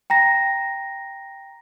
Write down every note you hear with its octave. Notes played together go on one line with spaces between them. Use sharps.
G5 A#5 A#6